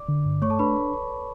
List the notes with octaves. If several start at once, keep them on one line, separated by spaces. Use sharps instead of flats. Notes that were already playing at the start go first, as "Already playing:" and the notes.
Already playing: D5 D6
D3
G2
A3 C#5 C#6
A4 A5
D4 B4 B5